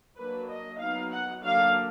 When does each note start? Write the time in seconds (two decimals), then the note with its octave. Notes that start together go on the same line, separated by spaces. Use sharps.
0.18 F#3 A#3 D4 B4
0.49 D#5
0.80 F#3 B3 D#4 F5
1.12 F#5
1.43 D3 F#3 A#3 D4 F5